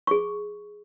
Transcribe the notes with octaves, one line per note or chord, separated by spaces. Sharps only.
G#4 C#6